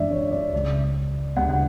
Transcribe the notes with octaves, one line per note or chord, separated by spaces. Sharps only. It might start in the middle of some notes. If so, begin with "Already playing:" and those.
Already playing: F#2 E3 G#3 D4 D5 E5
C#5
D5
C#2 C#3 G#3
D2 C#3 G#3 B3 F#5
F#5